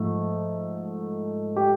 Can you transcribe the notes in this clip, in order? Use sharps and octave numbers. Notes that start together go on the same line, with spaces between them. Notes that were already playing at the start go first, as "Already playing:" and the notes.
Already playing: G#2 F3 A3
G4